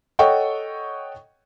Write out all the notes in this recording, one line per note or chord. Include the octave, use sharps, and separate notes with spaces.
A4 C#5 D#5 F#5 G5 C#6